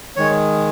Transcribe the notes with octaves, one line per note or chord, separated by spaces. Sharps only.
D#3 G#3 C#5